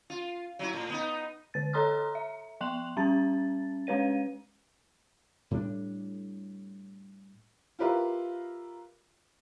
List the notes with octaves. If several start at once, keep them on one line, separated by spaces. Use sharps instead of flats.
F4
F#3 E4
A2
B3 D#4
D3 A6
A4 C#5 A#5 C6 D#6 F6
E5
F3 G5 C6 F#6 F7 F#7
G3 C#4 A5 A6
G#3 C#4 B4 C#5 D#7
A2 G3 C4 D4
F4 G4 A#4 B4 E5 F5